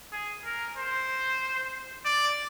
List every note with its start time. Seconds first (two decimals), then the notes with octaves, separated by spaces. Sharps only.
0.12 G#4
0.44 A#4
0.77 C5
2.05 D5